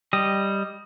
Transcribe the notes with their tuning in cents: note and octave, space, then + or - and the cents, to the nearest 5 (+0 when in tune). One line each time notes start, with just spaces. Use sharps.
G3 +0 D#5 +0